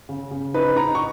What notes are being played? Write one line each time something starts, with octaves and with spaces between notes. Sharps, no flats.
C#3
C#3
D#4 B4
D#4 A#5
C#6